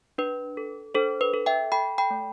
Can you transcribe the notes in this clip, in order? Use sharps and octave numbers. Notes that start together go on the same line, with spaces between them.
D4 B4
A4
D4 A4 C5
B4
A4
E5 G5
A4 G5 B5
G5 B5
A3